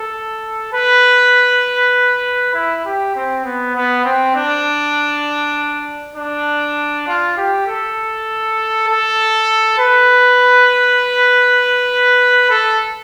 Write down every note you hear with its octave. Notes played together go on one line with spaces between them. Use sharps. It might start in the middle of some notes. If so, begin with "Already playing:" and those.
Already playing: A4
B4
E4
G4
C4
B3
B3
C4
D4
D4
F4
G4
A4
A4
B4
A4